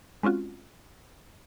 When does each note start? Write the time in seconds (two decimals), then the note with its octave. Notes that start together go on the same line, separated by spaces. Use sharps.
0.23 G#3 C4 C#4 F4 F#4